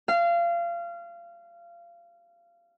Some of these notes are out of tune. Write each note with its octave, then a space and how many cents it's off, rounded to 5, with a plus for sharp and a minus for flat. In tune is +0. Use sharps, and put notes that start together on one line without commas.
F5 -25